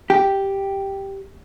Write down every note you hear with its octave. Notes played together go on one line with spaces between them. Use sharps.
G4